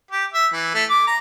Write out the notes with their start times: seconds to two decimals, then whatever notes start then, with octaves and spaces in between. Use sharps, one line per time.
0.11 G4
0.33 E5
0.54 E3
0.74 A3
0.90 D6
1.07 A#5